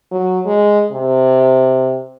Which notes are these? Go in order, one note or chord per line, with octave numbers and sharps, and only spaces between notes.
F#3
G#3
C3